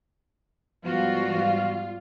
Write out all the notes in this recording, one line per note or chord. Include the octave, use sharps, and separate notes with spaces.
G#2 F3 G3 B3 F4 F#4